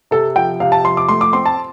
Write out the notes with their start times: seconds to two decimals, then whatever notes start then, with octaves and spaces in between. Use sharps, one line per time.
0.11 C3 A4
0.35 F3 G5
0.60 C3 F5
0.72 A5
0.84 F3 C6
0.97 D6
1.09 A3 C6
1.21 D6
1.33 C4 C6
1.46 A5